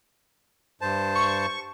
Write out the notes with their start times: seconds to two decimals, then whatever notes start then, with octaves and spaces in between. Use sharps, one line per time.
0.81 G2 C5 A5
1.15 C#6